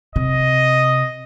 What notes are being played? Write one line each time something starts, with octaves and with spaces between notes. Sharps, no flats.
C3 D#5